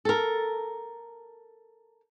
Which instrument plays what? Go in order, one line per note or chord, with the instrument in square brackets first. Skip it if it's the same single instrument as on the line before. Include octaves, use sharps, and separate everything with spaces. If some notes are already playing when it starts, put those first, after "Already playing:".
[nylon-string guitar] A4 A#4